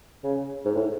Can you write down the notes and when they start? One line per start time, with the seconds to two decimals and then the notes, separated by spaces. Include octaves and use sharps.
0.24 C#3
0.65 G#2
0.75 A2